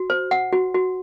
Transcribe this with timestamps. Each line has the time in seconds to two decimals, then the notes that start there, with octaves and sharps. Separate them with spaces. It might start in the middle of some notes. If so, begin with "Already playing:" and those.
Already playing: F#4
0.10 C5
0.31 F#5
0.53 F#4
0.75 F#4